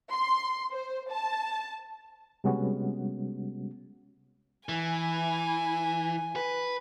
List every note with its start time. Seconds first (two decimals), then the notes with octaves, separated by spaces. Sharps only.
0.12 C6
0.71 C5
1.11 A5
2.44 C3 G3 G#3 B3 C#4 F#4
4.69 E3 G#5
6.36 B4